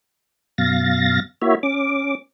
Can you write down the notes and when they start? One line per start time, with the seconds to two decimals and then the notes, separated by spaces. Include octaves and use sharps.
0.58 F#2 B2 F5 A6 A#6
1.42 A#3 E4 F#4 C#5 E5
1.63 C#4 D6